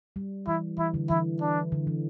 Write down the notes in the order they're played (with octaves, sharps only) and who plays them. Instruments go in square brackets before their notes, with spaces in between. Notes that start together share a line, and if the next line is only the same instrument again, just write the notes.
[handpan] G3
[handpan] E3 [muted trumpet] E4
[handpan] E3 [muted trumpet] E4
[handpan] D3
[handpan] E3 [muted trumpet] E4
[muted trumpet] D4
[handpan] D3
E3